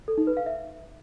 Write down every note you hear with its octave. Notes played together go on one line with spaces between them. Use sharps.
A4
D#4
B4
F5
E5